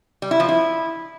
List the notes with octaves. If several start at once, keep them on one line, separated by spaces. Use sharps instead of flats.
G3
E4
F3
E4